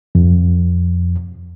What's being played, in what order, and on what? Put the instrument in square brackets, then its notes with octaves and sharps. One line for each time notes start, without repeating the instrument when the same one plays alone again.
[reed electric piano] F2